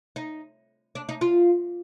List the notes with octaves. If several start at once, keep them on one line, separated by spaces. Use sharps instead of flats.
D#4
D4
D#4
F4